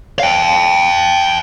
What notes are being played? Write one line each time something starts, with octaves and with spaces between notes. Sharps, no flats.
F5 G5